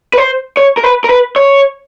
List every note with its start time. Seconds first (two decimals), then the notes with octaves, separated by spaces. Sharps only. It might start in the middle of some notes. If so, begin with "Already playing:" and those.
0.14 B4
0.18 C5
0.57 C#5
0.77 A#4
0.83 B4
1.04 A#4
1.10 B4
1.36 C#5